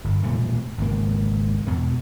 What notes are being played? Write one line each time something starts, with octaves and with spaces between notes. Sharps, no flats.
G1
E1 A#2 G3 A3
G#1 C#2 A#3
E2 B2